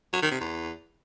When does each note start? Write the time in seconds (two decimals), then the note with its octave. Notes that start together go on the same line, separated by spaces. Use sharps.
0.13 F#3
0.22 D#3
0.32 C3
0.41 E2